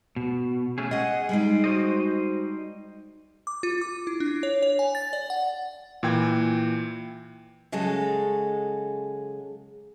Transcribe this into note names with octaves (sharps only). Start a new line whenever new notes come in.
B2
A3 C#4 G#4
G#4 D#5 F#5
G3 G#3 D#4
F#4 C5 D#5
D6
F4
D6
E4
D4
C#5
C#5
G#5
A6
D5
F#5
A#2 E3 G5 G#6
C#3 F#3 G#3 A4